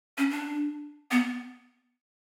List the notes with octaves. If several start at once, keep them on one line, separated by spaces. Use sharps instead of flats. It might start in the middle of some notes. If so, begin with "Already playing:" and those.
C#4
D4
B3